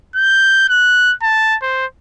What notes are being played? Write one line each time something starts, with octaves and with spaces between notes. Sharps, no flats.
G6
F#6
A5
C5